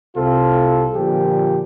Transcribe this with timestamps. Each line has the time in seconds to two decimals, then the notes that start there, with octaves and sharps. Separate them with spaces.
0.15 C2 C3 C4 F4 A4
0.94 A#2 D3 F3 G4